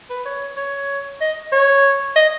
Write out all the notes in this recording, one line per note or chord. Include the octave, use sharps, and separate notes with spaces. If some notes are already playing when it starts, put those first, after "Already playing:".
B4
C#5
C#5
D#5
C#5
D#5